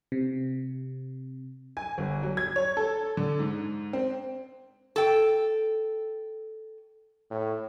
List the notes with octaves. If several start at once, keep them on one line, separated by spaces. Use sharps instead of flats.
C3
G#5
G1
F#3
G#6
C#5
A4
D3
G#2
C4
A4 G5
A2